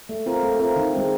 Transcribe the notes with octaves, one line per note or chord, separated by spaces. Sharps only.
A3
C4 F4 A#4
A3
C4 F4 A#4
D#3
G#3 C4 D#4